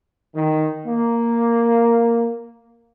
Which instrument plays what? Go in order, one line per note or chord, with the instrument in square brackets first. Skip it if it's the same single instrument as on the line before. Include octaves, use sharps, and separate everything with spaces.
[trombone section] D#3
A#3